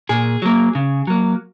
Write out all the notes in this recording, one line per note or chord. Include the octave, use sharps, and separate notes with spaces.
A#2 G#4
F#3 A#3
C#3
F#3 A#3